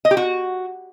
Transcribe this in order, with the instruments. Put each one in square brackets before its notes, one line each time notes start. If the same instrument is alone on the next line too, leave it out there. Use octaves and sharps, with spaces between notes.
[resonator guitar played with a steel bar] D#5
G4
F#4